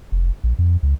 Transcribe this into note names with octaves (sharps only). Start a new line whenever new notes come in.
F1
A#1
F2
C#2